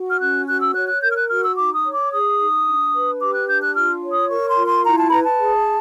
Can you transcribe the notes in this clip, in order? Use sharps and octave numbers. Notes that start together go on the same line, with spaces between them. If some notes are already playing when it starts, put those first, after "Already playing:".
Already playing: F#4
F6
C#4 F#6
F#4 F#6
E6
C#5 F#6
F#6
A#4 G6
F6
F#6
F#4 F6
E6
D#4 D6
D#6
C#5
D6
G#4 D#6
D#4
D4
B4
G4 D6
F#6
D4 G6
F#6
F4 F6
C#5
D#6
A#4 C#6
C6
F4
C6
E4 A#5
A5
B5
B4 A#5
A5
G#4